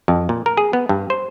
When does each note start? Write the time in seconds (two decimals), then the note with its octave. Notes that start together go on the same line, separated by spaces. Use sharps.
0.08 F2
0.29 A#2
0.46 A#4
0.57 G#4
0.73 B3
0.89 G2
1.10 C5